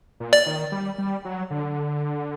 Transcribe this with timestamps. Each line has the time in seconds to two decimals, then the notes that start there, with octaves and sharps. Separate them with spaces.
0.20 A#2
0.33 D5
0.46 D#3
0.72 G3
0.98 G3
1.25 F#3
1.51 D3